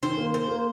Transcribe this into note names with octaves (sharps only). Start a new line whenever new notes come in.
D#3 C5
A#3
A#3 C5
A#3